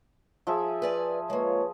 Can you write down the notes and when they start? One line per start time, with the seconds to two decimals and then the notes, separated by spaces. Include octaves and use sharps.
0.47 F3 G#4 E5
0.82 B4 D5 G#5
1.30 G#3 A#3 F4 B4 C#5